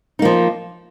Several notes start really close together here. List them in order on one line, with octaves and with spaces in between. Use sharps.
D#4 A#3 F3